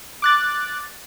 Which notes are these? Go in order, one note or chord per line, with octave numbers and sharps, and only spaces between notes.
D6 F#6 A6